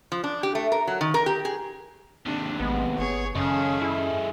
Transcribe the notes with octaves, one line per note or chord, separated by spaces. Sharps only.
F3
D4
G4
A3
A#4
F#3
D#3
A#4
G4
G#4
D#2 C3 C4 D4
A1 G#3 B3
G1 G#4 C#5
F#2 C#3 G#3 C#4 G#4 A4
E4